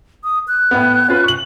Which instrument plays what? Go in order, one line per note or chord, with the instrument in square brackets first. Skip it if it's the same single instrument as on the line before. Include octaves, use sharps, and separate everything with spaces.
[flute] D#6
F#6
[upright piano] A2 B3
C#4 F4 B4
C#6 F#7